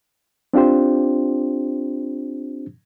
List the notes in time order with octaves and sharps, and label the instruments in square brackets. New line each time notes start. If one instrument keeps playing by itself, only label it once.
[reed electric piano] C4 D4 F4 G4 C5